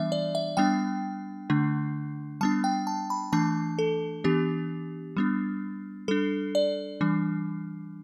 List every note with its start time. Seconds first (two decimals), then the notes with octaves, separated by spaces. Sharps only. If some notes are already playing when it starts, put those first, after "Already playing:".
Already playing: E3 G3 B3 D4 E5
0.12 D5
0.35 E5
0.57 G3 B3 D4 G5
1.50 D3 A3 D4
2.41 G3 B3 D4 A5
2.64 G5
2.87 A5
3.10 B5
3.33 E3 A3 D4 A5
3.79 A4
4.24 E3 B3 D4 G4
5.17 G3 B3 D4
6.08 G3 D4 A4
6.55 D5
7.01 E3 G3 D4